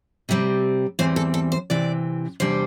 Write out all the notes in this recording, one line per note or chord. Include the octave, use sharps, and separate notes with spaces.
C3 G3 C4
E2 E3 G3 C4 C5
A4
A4
C5
C3 E3 C4 D5
E2 C3 G3 D4 C5